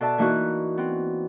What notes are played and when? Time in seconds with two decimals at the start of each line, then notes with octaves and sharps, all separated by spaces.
0.01 B2 A4 D5 E5 A5
0.18 E3 A#3 D#4 E4 F#4
0.78 B3 C4